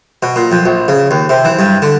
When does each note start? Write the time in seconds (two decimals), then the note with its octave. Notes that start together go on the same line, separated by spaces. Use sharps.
0.23 B2
0.36 A#2
0.52 F2
0.66 A#1
0.88 C#3
1.11 D#2
1.29 C3
1.45 E3
1.59 G2
1.82 D3